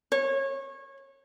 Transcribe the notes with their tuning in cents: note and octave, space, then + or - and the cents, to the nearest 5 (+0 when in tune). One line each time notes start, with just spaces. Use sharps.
C#5 -25